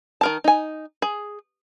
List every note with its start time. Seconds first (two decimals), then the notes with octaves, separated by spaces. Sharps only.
0.21 D#3 A#4 A5
0.44 D#4 G#5
1.02 G#4